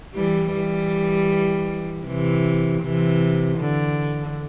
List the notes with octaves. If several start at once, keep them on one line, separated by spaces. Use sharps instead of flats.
E3 G3
E3 G3
C3 E3
C3 E3
D3